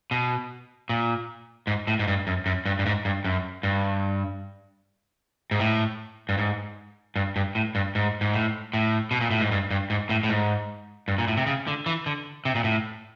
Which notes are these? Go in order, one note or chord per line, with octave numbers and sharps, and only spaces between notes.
B2
A#2
G#2
A2
G#2
G2
F#2
F#2
G2
G2
G#2
G2
F#2
G2
G#2
A2
G2
G#2
G2
G2
A2
G2
G#2
G#2
A2
A2
B2
A#2
A2
G#2
G2
G2
G#2
A2
A2
G#2
G2
A#2
A2
C3
C#3
D3
E3
D3
C3
A#2
A2